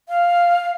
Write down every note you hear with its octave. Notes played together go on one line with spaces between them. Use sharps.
F5